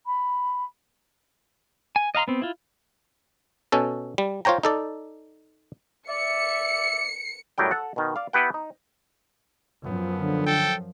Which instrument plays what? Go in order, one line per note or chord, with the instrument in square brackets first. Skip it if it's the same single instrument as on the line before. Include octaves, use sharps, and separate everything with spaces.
[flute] B5
[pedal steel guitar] G#5
D#5 F5 A#5 C6
B3 C4
E4 F4
[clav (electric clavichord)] B2 C#4 A4
G3
F4 C5 C#5 G5 A#5
D#4 A4 D5
[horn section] D5 E5 [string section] C#7
[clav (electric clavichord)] F#2 A2 F#3 G3 G5
A4 F#5
B2 D#3
D5 F5
B3 E4 G4 B4 F#5 G5
D#4
[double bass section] F#2 F3 [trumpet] B3
[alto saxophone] D3
[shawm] A4 [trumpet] G5